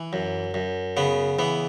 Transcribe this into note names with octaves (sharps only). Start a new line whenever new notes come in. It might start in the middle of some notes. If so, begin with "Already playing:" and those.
Already playing: E3
F#2
F#2
C#3 B3
E3 B3